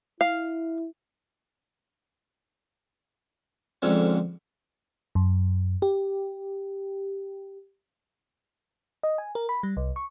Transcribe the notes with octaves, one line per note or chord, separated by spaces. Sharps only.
E4 F5
F2 G#2 D3 F3 C#4
F#2
G4
D#5
G#5
A#4
B5
G3
C2
C#6